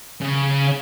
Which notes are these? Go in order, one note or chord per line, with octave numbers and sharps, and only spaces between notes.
C#3